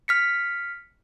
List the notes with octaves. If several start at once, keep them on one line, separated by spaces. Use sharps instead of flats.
F6 B6 C#7